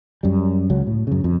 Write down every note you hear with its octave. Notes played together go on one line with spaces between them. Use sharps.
F#2 G3
C#2 F#3
A2
F#2 C#3
F2